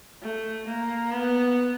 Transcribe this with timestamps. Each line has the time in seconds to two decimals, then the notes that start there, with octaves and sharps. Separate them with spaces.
0.22 A3
0.67 A#3
1.12 B3